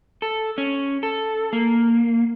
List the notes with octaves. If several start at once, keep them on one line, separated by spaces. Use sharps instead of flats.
A4
C#4
A4
A#3